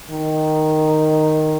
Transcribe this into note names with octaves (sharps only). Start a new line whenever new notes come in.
D#3